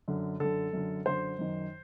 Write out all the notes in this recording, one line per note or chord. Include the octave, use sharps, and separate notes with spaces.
F#2 D3
F#2 D3 A4
F#2 D3
F#2 D3 C5
F#2 D#3